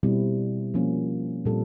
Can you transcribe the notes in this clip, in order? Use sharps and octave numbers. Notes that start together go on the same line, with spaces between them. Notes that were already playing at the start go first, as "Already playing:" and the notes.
B2 G3 C4 E4
F3 A#3 C#4 F4
A#2 G3 C4 F4 A4